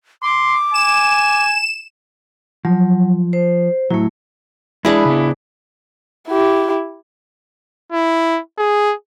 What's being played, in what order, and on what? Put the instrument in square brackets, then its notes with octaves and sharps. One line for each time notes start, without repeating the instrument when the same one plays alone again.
[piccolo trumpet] C6 [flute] D6
[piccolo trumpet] G#5 [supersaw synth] E7
[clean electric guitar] F3 [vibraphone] F#3
[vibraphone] C5
[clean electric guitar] A2 F#3 [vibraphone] A3 E4
[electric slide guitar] G#3 D5 [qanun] D4 G#4 B4 [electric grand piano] E4
[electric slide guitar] C#3 B3
[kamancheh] E4 G4
[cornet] E4
G#4